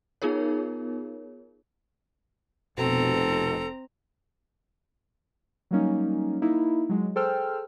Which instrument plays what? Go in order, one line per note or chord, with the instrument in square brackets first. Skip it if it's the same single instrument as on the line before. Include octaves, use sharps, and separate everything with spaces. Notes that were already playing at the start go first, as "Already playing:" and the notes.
[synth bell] B3 D#4 F4 G#4 A#4 C#5
[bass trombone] F1 [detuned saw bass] B2 [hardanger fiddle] C4 A#5 [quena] A4
[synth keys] F#3 G3 A#3 C#4 D#4
A#3 D#4 E4
F#3 G#3
G#4 A4 C5 G5 E6 F6